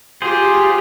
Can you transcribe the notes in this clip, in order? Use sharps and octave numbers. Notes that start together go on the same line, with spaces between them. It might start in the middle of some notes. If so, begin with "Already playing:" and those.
F4 G4 G#4 C5